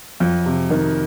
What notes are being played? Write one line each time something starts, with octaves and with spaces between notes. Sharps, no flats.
F2
C3
D#3